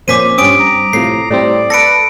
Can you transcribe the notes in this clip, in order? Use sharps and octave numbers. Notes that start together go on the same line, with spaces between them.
F2 A#2 C#4 C5 D6 B6 D#7
G2 C4 C#4 D#6 D7
A#5
A2 C3 F3 C7
A2 G3 C4 D5
A4 B4 A#6 C#7 D7